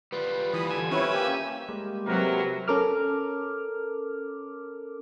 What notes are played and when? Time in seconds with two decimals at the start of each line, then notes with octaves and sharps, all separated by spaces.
0.12 G3 F4 B4
0.54 E3 B5 D#6
0.71 D3 G#5 E6 G#6
0.91 C4 C#4 E4 B4 C#5
1.12 A#3 G4 E5
1.69 G3 G#3 A#3
2.08 C3 F#3 A#4 B4
2.68 C#4 A4 A#4 D6 F6